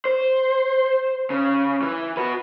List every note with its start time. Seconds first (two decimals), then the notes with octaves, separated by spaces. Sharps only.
0.05 C5
1.30 C#3
1.82 E3
2.17 F#4 B4